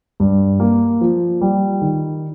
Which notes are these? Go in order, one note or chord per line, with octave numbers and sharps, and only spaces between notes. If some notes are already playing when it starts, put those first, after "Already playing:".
G2
A#3
F3
G3
D#3